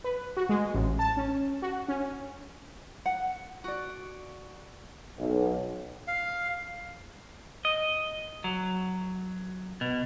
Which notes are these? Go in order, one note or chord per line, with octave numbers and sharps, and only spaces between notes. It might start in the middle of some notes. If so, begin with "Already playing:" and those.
B4
F#4
G#3
A1
A5
C#4
F#4
C#4
F#5
F#4 D5
B1
F5
D#5
F#3
B2